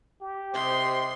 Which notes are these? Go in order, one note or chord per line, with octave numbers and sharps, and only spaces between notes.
G4
C3 C5 D#5 C6